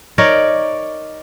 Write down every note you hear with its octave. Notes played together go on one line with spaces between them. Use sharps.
D#4 A#4 C#5 D5